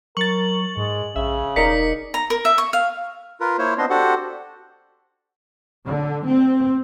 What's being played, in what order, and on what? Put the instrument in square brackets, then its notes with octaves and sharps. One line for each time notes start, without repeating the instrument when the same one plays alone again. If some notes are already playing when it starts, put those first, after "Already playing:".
[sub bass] F#3 [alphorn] A#4 [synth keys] C#6 A6 [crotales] F#7
[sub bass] G#2 [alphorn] G#3
[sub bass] A#1 [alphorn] C#3 [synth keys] E5
[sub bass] E1 [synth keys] D#4 A#4 D5 [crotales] B6 C#7
[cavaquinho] A#5
A#4
E5
C#6
F5
[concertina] F4 A#4 B4
A#3 E4 C5 C#5
B3 C4 D4 D#5 C6
D4 F#4 G4 A4 C5 F#5
[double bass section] D3
C4